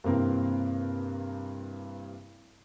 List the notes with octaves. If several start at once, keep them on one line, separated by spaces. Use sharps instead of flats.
G2 C3 E3 A#3 C4 A#4